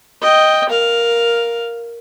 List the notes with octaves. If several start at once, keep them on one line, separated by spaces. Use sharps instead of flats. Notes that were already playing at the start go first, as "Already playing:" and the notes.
D#5 G5
A#4 F5